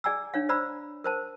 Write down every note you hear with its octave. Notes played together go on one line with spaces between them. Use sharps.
G#4 D5 G#5 A#5 E6
D4 C#5 F5
C5 D5 A#5 B5 E6
A#4 C5 A5